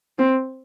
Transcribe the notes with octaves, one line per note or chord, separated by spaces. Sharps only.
C4